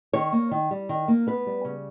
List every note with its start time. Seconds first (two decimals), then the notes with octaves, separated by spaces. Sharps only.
0.13 D#3 C#5
0.32 A#3
0.51 D#3
0.71 G3
0.89 D#3
1.08 A#3
1.27 B3 B4
1.47 G3
1.65 C#3